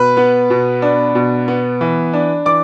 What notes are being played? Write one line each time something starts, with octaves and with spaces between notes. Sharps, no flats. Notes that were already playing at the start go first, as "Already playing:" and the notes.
Already playing: B2 B4 B5
B3
B2
D4
B2
B3
E3
D4
E3 D5 D6